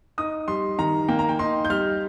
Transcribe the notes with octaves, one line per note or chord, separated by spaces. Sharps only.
D#4 D#6
G3 C6
D#3 A#5
A#3 G5
A#5
G5
D#4 C6
G6
G3 F6